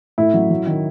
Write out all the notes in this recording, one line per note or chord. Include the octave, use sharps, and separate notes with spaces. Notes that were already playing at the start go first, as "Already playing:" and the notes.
A2 E4
F#3
F#3
D#3